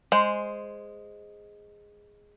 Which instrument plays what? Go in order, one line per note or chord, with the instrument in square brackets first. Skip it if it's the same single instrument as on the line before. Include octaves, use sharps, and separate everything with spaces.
[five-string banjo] G#3 C5